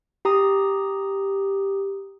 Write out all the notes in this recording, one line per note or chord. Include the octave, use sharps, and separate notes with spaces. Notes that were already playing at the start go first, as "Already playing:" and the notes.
G4 A#5 D#6